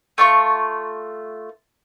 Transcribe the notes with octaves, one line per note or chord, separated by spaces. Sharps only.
A3 F4 C#6